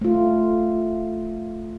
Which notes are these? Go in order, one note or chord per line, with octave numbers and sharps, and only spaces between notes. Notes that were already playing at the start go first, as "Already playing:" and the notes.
A3 F4